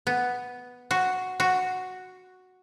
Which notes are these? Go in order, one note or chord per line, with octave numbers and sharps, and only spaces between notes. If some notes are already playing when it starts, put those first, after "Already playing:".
B3
F#4
F#4